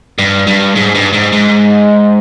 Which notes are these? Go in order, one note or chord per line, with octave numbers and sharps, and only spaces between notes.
G2
G2
G#2
G2
G#2
G#2